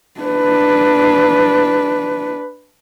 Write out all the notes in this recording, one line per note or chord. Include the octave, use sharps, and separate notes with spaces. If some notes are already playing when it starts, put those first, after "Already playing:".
D4 B4